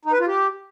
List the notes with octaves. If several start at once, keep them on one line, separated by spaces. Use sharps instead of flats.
D#4
B4
F4
G4